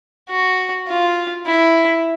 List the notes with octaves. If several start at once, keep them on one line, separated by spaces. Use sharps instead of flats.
F#4
F4
E4